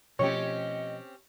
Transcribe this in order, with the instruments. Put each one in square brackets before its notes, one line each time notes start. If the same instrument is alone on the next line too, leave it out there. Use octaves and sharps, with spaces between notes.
[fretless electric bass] B2 F3 A3 [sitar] C4 C#4 G4 [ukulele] C#5 [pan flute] D#5